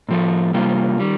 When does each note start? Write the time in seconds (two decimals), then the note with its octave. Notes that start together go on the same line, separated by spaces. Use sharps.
0.09 A2 F3 A3
0.54 C3 G3 A#3 F4
1.00 D#3 G3